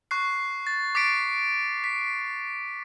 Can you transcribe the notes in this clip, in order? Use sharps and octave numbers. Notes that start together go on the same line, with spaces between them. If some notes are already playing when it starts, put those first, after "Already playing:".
C#6 F#6 C7
A6
D6 A6 B6 C7 D7
B6